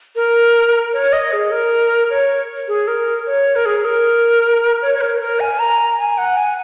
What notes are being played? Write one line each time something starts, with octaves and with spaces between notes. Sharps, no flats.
A#4
C#5
D#5
G#4
A#4
C#5
G#4
A#4
C#5
A#4
G#4
A#4
C#5
C#5
A#4
A#4
G#5
A#5
G#5
F#5
G#5